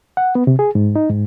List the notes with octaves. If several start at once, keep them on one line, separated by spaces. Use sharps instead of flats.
F#5
B3
C3
G#4
G#2
D#4
G#2